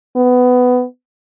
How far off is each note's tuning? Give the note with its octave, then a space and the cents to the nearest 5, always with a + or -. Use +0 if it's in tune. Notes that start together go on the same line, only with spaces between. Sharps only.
B3 +15